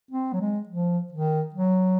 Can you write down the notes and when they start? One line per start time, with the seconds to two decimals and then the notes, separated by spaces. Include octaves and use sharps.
0.11 C4
0.33 F#3
0.41 G#3
0.69 F3
1.12 D#3
1.54 F#3